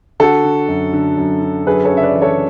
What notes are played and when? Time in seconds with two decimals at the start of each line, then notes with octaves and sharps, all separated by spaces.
0.20 D3 F#4 A4
0.44 D3
0.68 F#2
0.93 D3
1.18 F#2
1.42 D3
1.67 F#2 G#4 B4
1.85 A4 C#5
1.91 C#3
1.97 E5
2.03 B4 D5
2.16 E3
2.22 A4 C#5